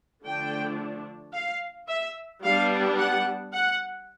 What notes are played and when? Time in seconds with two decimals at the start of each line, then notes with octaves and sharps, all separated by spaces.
0.24 D3 F3 A3 D4 G5
1.34 F5
1.88 E5
2.44 G3 B3 D4 F5
2.98 F#5
3.53 F#5